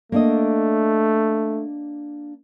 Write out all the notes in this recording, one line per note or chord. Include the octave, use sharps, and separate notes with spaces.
A3 A#3 D4 D#5